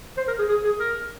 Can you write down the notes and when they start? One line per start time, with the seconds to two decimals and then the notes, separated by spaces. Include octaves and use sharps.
0.17 C5
0.28 A#4
0.38 G#4
0.49 G#4
0.64 G#4
0.80 A#4